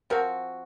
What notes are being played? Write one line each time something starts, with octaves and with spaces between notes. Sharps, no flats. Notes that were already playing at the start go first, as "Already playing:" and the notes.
F3 C4 F#4 A#4